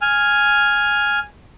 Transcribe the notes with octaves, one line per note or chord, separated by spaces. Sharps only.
G#5 F6